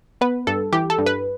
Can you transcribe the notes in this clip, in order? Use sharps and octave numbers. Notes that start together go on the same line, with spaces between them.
B3 B4
G2 A4
E3 G4
A4
G2
B4